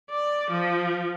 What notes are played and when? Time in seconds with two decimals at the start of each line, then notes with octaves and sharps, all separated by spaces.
0.10 D5
0.50 F3